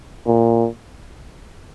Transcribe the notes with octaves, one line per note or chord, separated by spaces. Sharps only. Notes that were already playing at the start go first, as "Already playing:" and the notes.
A#2